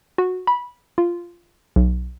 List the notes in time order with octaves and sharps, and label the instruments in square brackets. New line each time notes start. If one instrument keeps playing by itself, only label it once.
[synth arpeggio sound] F#4
B5
F4
B1